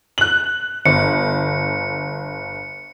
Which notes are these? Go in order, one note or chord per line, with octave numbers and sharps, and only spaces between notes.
F#6 F#7
G1 C#7